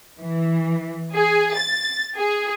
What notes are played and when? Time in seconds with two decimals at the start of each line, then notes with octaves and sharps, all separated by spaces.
0.19 E3
1.15 G#4
1.57 A6
2.17 G#4